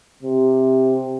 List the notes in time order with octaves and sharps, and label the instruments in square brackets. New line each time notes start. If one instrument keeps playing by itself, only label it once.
[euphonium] C3